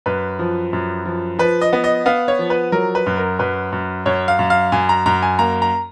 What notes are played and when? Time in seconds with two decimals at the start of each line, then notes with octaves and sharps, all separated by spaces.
0.06 F#2 B4
0.39 F3
0.73 F#2
1.05 F3
1.39 F3 B4
1.61 D#5
1.73 B3
1.84 D#5
2.06 B3 F5
2.28 C#5
2.39 F3
2.50 B4
2.72 F#3 A#4
2.95 B4
3.06 F#2
3.17 A#4
3.39 F#2 B4
3.72 F#2
4.06 F#2 C#5
4.28 F5
4.39 F#2
4.50 F5
4.72 F#2 G#5
4.89 A#5
5.06 F#2 A#5
5.22 G#5
5.39 A#3 A#5
5.62 A#5